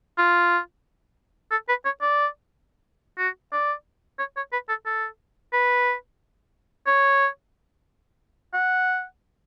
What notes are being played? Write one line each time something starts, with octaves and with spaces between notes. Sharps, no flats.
F4
A4
B4
C#5
D5
F#4
D5
C#5
C#5
B4
A4
A4
B4
C#5
F#5